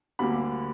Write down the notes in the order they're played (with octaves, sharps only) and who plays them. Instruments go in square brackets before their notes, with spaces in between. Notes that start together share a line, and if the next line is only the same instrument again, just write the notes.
[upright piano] D2 D3 G3 A#3 B5